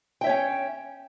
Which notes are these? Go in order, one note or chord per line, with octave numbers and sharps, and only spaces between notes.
C#4 C#5 E5 G5